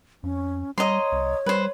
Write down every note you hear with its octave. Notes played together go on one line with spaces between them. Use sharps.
F2 C#4
G3 C#5 D#5 A#5 C6
C2
G3 B4 C5